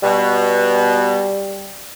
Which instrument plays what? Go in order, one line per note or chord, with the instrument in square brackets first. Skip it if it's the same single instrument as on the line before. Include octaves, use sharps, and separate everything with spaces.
[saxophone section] B2 [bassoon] G3